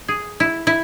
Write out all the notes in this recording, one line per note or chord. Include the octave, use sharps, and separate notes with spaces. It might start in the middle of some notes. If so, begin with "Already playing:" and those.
G#4
E4
E4